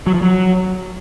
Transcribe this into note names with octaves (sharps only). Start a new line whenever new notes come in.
F#3
F3
F#3